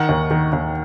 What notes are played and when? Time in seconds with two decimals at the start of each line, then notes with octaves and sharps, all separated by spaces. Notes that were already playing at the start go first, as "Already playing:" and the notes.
Already playing: D#3 F#5
0.09 D#2
0.31 D#3
0.53 D#2